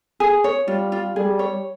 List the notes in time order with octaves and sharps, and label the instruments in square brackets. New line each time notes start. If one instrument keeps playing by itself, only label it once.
[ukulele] G#4
C#5
[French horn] G3 [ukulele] F4
[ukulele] F4
[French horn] G3 [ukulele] G#4
[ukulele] C#5